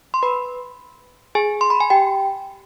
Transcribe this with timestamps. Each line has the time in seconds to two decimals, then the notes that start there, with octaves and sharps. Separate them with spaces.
0.14 C6
0.23 B4 B5
1.35 G#4 G#5
1.61 C6
1.70 B5
1.80 G#5
1.90 G4 G5